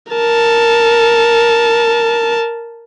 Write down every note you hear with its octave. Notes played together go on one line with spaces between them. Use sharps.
A#4 A5